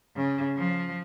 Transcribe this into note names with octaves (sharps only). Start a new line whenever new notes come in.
C#3
F3